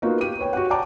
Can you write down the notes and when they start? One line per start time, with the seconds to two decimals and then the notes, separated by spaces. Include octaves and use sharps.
0.02 A#3 B3 D#4 F4 F#4
0.20 G4 D#7
0.39 B4 C#5 G5
0.53 F#4 G4 F#5
0.70 D5 F#5 G5 A5 A#5 D6